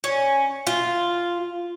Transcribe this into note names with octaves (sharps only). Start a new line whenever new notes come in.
C#4
F4